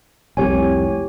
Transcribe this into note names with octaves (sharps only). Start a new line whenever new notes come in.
F1 C2 G4 C#5 G#5